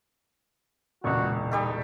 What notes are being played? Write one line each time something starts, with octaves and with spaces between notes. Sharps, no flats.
E1 C#2 A#2 F#4 D5 C#6
G3 D#4 G4 A4